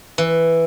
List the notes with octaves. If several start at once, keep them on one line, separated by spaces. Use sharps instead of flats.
E3